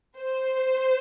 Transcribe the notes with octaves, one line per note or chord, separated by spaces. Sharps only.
C5